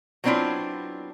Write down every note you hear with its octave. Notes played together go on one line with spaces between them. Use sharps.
F#3 B3 C4 D4 E4 F4